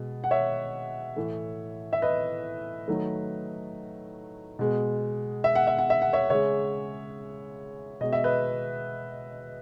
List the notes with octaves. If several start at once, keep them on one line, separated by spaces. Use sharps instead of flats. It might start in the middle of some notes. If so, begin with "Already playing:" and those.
Already playing: B2 G#3
F#5
C#5 E5
A2 E3 A3
E5
B4 D#5
D#3 F#3 A3
B2 G#3
E5
F#5
E5
F#5
E5
F#5
C#5 E5
C#3 G#3 C#5 E5
B2 G#3 D#5
E5
B4 D#5